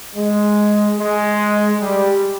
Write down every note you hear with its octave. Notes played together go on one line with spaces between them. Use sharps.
G#3
G#3
G3